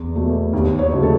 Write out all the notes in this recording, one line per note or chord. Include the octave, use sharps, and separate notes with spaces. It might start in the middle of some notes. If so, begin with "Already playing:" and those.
Already playing: E2
B2 A3
D#2
C#5
C#3 F#3 A3 D#4
A4